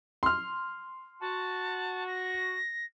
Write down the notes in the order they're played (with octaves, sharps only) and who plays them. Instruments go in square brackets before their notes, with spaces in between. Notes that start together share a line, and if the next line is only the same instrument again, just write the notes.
[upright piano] C6 F6
[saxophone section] F#4 [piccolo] A5
[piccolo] A#6